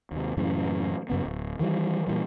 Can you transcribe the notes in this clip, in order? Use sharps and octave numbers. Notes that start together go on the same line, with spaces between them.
D#2 C3
F#2 A2 C#3 E3
F#2 C#3 B3
D1
D#3 E3 G3
A#2 E3 G3